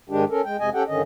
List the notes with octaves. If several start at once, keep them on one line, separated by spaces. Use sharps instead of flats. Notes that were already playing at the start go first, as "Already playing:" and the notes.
G#2 D#3 G#3 D4 G4
C#4 A4 A#4
G#3 G5
F2 C3 G#3 D#5 G#5
C#4 G4 A4 F#5 G5
G2 D3 D#3 C#4 D#5